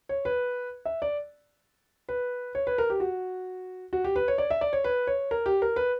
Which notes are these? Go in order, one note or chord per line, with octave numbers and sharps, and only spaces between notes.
C#5
B4
E5
D5
B4
C#5
B4
A#4
G4
F#4
F#4
G4
B4
C#5
D5
E5
D5
C#5
B4
C#5
A#4
G4
A#4
B4